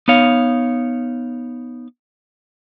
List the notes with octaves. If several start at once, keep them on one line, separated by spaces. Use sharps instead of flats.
B3 D#4 C#5 F5